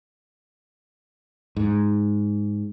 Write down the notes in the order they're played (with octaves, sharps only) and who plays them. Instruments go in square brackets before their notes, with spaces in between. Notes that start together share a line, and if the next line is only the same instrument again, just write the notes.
[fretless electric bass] G#2